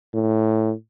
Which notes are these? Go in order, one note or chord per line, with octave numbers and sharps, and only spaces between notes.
A2